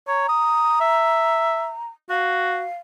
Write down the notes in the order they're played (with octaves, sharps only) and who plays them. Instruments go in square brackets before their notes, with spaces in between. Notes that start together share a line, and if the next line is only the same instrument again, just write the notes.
[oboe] C#5 [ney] A#5
[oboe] D#6
E5
[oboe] F#4 [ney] F5